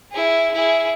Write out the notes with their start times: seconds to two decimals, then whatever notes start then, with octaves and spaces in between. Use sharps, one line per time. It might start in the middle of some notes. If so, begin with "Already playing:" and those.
0.12 E4 G#4
0.54 E4 G#4